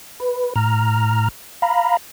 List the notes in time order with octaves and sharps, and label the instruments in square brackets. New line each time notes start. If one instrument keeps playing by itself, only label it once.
[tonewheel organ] B4
A2 A#5 F6
F5 A#5 B5